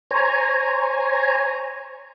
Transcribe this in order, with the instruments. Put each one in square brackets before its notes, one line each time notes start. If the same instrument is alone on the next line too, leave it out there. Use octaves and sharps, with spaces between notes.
[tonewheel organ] C5 C#5 G#5 A#5